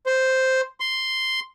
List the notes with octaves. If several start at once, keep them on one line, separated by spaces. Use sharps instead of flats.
C5
C6